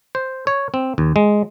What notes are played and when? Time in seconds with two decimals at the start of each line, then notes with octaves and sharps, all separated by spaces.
0.15 C5
0.47 C#5
0.74 C4
0.98 D#2
1.16 G#3